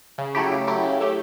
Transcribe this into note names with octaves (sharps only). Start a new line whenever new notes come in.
C#3
F#3 A3 E4 G4
C#3
F#3 A3 E4 G4
C#3
F#3 A3 E4 G4